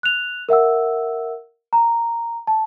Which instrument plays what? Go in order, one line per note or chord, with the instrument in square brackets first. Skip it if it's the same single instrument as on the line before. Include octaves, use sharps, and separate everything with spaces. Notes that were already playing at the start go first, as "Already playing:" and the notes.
[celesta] F#6 F7
A#4 E5 F#5 E6
A#5
A5